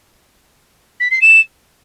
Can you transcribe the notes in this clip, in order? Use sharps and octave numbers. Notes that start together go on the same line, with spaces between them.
B6
C7
E7